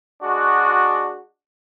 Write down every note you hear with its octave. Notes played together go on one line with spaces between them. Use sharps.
G#3 D4 F#4